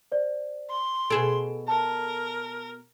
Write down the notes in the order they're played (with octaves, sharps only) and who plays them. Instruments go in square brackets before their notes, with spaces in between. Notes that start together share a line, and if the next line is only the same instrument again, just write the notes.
[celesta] C5 D5
[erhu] C6
[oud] B2 G#4 A4 [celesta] D7 E7
[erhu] A#4 [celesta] A5